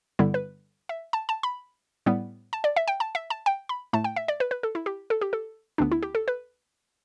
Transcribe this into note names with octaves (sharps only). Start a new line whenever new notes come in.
G2 D3 G3 B3 E4
B4
E5
A5
A5
B5
A2 G3 B3
A5
D5
E5
G5
A5
E5
A5
G5
B5
A2 A3 A5
G5
E5
D5
B4
B4
A4
E4
G4
A4
G4
A4
D2 D3 B3 D4
E4
G4
A4
B4